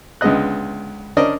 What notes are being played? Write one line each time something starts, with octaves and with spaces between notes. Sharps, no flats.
C#2 D3 G#3 B3 D#5 F#6
C#4 D4 A#4 C5 D5 D#5